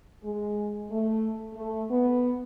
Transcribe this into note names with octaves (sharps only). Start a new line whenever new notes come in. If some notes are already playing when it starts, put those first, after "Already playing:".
G#3
A3
A3
B3